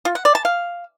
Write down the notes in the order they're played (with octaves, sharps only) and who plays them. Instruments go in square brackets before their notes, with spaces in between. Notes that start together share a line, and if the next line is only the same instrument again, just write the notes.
[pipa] F4
F#5
D5
A5
F5